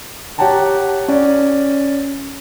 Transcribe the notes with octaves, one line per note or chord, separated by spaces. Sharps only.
G4 C#5 F#5 G5 A5 A#5
C#4 D5